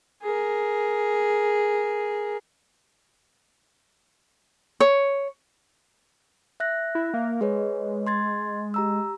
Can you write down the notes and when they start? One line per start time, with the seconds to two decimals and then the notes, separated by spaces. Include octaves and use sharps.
0.22 G#4 A#4
4.80 C#5
6.60 E5 F#6 A#6
6.95 E4
7.14 A#3
7.41 G#3 G#4 B4 C#5
8.07 C6 G#6 A6
8.74 G4 A#5 E6